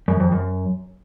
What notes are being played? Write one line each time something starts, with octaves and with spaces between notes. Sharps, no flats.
F#2
F2
F#2